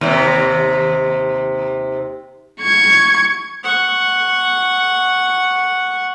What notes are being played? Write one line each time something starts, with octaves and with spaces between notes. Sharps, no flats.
D#2 C3
C#6 G#6
F#5 C#6